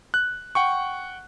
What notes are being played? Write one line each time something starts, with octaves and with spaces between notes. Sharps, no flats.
F#6
F#5 G5 C#6